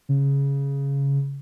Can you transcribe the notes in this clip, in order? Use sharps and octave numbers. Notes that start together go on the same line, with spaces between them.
C#3